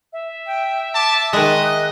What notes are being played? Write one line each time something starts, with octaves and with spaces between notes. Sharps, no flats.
E5
G5
A5 D6
D#3 G#3 D#5 F#6